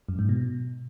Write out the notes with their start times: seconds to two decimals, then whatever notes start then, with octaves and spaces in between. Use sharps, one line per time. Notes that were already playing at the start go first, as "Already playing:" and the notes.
0.09 F#2
0.19 G#2
0.29 B2